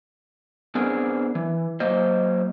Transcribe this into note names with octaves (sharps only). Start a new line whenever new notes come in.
B3 C4 D4 G#4 A#4
E3
F#3 A#3 C5 D#5